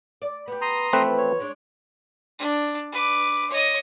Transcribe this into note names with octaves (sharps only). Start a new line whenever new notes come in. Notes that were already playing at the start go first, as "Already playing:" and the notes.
D5
B3 G4
A#5 C6 D#6
E3 F3 A3 B3 C4 B4
C#5
G#3 D4
D4
B4 D6
C#5 D#5